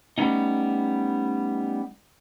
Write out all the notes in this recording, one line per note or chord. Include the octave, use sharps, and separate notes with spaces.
G3 A3 B3 C#4 D#4